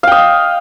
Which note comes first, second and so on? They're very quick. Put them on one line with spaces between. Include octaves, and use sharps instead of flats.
F5 G5 D#5